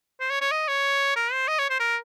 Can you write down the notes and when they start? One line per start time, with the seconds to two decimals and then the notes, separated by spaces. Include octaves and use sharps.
0.20 C5
0.30 C#5
0.41 C#5
0.51 D#5
0.68 C#5
1.16 A#4
1.32 C5
1.48 D#5
1.59 C#5
1.70 C5
1.80 A#4